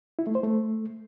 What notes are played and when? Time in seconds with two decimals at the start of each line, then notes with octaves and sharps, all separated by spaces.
0.19 E4
0.27 A3
0.35 C5
0.43 A3